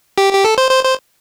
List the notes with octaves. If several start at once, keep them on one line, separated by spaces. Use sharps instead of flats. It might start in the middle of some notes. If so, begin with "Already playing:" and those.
G4
G4
A4
C5
C5
C5